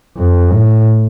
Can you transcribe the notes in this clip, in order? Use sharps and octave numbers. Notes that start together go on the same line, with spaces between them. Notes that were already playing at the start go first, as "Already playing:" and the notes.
F2
A2